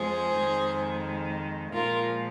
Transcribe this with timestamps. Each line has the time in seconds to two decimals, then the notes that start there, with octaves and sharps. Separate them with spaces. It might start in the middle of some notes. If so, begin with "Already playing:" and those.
Already playing: F2 F3 G#3 G#4 C5
0.35 F2 D#3 G#3
1.72 A#2 F3 G#3 F4 A#4